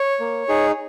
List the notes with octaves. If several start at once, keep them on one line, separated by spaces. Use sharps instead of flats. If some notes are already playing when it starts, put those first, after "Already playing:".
Already playing: C#5
A#3
D#4 G#4